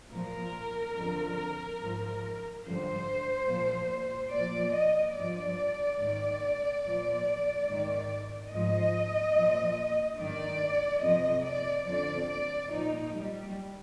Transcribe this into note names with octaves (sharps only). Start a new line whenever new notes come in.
A#2 F3 A#4
F2 D3 F3
G#2 F3
G2 D3 F3 C5
A#2 F3
A#2 F3 D5
D#5
G2 F3 D5
G#2 D#3
A#2 F3
G#2 D#3
G#2 F3 D#5
A#2 F3
G2 D#3 D5
F2 C3 F3 D#5
D5
F2 D3 F3 D5
D5
A#2 F3 D#4
G3